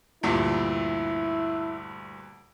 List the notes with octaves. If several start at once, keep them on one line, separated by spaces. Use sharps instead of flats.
D2 G2 A#2 E4